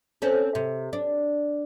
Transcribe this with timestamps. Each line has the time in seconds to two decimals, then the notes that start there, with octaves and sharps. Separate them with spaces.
0.22 C4 C#4 A4
0.55 C3
0.93 D4